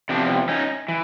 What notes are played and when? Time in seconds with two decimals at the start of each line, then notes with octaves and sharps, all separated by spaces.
0.09 E2 C3 F3 C4 D4
0.49 C#4 D#4
0.88 E3